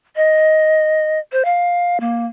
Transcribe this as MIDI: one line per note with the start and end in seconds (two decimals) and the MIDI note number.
0.16 1.19 75
1.32 1.43 72
1.45 2.00 77
2.00 2.26 58